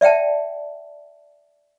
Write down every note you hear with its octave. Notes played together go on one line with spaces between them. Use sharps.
D5 E5 F#5 G5 A5